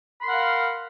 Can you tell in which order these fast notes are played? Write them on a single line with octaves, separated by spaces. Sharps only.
B5 C6 A#4 F#5 F5